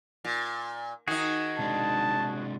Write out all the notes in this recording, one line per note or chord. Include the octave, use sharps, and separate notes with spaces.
A#2
D#3 D#4 F#4 G#4
C3 G#3 D4 A5